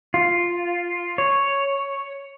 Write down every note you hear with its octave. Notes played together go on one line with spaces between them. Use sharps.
F4
C#5